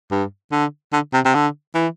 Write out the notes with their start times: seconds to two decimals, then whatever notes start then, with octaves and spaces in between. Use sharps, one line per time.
0.11 G2
0.52 D3
0.93 D3
1.14 C3
1.25 C3
1.35 D3
1.75 E3